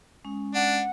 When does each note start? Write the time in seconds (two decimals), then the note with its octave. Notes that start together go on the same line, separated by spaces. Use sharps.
0.25 G#3 C#4
0.55 D4 F#5